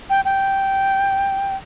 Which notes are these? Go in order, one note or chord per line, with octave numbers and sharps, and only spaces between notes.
G5
G5